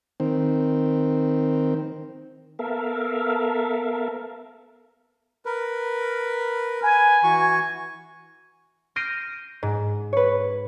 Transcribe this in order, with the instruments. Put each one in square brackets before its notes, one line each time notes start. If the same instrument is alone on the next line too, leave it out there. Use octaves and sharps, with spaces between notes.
[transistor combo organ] D#3 C4
[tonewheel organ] B3 A4 A#4 E5 F5
[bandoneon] A#4 B4
[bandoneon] B4 [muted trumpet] G#5
[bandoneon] E3 F#4 C#6
[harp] F6 G6 A#6 C7 D7 D#7
G#2
B4 C#5